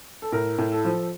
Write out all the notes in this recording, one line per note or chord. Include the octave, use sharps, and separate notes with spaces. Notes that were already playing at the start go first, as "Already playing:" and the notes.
A4
A2 A#4
A2
A4
F3